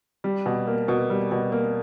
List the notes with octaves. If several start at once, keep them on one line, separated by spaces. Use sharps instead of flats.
G3
B2
A#3
B2
G3
B2
A#3